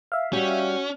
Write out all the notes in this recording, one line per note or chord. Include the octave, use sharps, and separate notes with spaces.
E5 F5
G3 C#4 F#4 G4